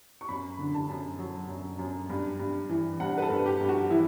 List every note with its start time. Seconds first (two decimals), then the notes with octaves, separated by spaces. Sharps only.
0.21 C#6
0.29 F#2 B5
0.59 D3
0.74 A5
0.89 F#2
1.19 F#3
1.49 F#2
1.79 F#2
2.10 G2
2.40 G2
2.69 E3
3.00 G2 F#5
3.18 B4
3.22 A4
3.30 G2
3.46 G4
3.61 G2
3.69 F#4
3.90 E3 E4